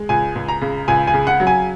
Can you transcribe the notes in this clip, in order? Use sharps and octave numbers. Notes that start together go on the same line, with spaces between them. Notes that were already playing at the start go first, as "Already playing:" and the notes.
Already playing: G#3
C#2 G#5
C#2
A#5
C#3
C#2 G#5
G#5
C#3
F#5
F#3
G#5